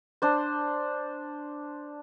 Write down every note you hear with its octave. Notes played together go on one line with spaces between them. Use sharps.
D4 C5